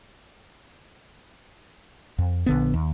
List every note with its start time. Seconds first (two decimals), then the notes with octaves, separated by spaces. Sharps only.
2.18 F2
2.46 A#1 D3 B3
2.74 D#2